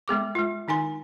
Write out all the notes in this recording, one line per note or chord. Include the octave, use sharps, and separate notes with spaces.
G#3 B3 G#4 D6
G#3 F4
D#3 D#4 G#5 C6